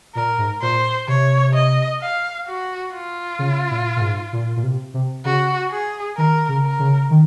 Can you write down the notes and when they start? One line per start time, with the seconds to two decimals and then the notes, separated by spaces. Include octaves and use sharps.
0.15 A#2 A#4
0.38 G#2
0.62 A#2 C5
1.08 C3 C#5
1.54 D#5
2.01 F5
2.47 F#4
2.93 F4
3.39 C#3
3.71 A#2
3.96 A#2
4.01 G#2
4.33 A#2
4.57 A#2
4.63 C3
4.94 C3
5.25 C#3 F#4
5.71 G#4
6.17 D#3 A#4
6.49 C#3
6.64 A#4
6.79 C#3
7.10 D#3